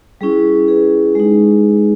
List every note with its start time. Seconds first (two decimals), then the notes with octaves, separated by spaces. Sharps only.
0.21 G3 C#4 E4 G#4
0.68 G#4 B4
1.15 G#3 D#4